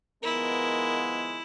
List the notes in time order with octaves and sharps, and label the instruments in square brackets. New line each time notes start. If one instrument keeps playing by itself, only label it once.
[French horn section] D#3 F3 B3 [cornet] G#3 [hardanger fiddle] E4 [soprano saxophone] A#4